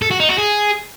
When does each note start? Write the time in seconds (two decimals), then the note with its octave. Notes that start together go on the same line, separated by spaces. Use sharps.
0.02 A4
0.11 F#4
0.20 D#4
0.29 F#4
0.38 G#4